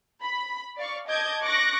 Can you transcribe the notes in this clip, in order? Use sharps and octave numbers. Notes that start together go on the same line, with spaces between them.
B5
D5 F5 C#6
D#5 A5 D6 G6 G#6
C#6 D6 F#6 A#6